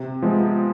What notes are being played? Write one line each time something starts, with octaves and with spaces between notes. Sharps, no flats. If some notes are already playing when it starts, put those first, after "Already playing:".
Already playing: C3
F3 G#3 B3